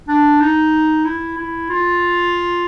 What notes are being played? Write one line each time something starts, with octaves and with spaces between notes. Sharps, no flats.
D4
D#4
E4
E4
F4